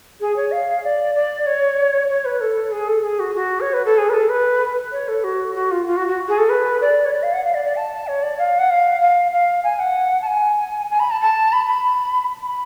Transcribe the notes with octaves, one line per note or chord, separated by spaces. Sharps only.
G#4
C#5
F5
D5
D5
C#5
C#5
B4
A4
G#4
A4
G#4
F#4
F#4
C#5
B4
A4
G#4
B4
A4
B4
C#5
A4
F#4
F#4
F4
F4
F#4
F#4
G#4
A4
B4
D5
C#5
D5
F5
F#5
F5
D5
D5
A5
C#5
D5
F5
F#5
F5
F5
F5
G#5
F#5
A5
G#5
G#5
B5
A5
A5
B5
B5
B5